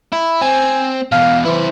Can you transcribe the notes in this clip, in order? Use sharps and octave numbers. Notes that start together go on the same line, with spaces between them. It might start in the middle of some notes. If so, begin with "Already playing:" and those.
E4
C4 G#5
E2 B2 F5
E3 E4 C5